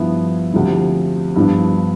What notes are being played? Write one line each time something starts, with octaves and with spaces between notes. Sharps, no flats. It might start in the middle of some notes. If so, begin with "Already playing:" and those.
Already playing: G2 F3 B3 E4
D2 C3 F3
G2 F3 B3 D4